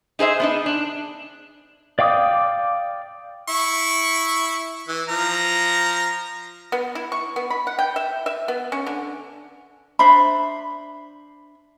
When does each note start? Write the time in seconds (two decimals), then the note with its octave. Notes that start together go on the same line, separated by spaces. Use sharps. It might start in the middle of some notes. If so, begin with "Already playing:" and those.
0.19 D#4 G#4 C5 E5
0.40 B3 D4 D#4
0.66 D4
1.99 D5 F5 G5 D6 D#6
3.48 E4 C#6
4.88 E3
5.09 F3 A#5
6.72 B3
6.95 E4
7.12 C#6
7.36 B3
7.50 B5
7.67 F#5
7.79 G5
7.96 E5
8.26 E5
8.48 B3
8.72 C#4
8.87 D3
9.99 D4 C5 E5 B5